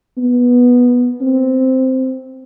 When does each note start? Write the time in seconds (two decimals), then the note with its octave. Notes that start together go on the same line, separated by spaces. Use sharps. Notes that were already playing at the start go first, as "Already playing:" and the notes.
0.18 B3
1.21 C4